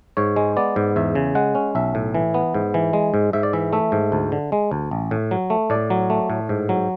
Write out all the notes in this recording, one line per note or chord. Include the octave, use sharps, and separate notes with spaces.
G#2 C#5
G#3
B3 D5
G#2
E2 E5
C#3
G#3 F#5
C#4
B1 E5
A2
E3
B3
G#2
E3
G#3
G#2
G#2 E5
D5
E3 E5
A3 E5
G#2
D2
D3
G#3
D2
A1
A2
F#3
A3
A2 D5
F#3
A3
A2
G#2
F#3